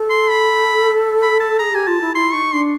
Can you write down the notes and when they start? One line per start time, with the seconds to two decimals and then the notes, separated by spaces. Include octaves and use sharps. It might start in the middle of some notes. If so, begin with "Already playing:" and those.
Already playing: A4
0.10 C6
0.29 B5
1.22 B5
1.41 A5
1.59 G#4 A#5
1.73 G4 G#5
1.87 F4 A5
2.01 E4
2.15 E4 C6
2.33 D#4 C#6
2.53 D4 C6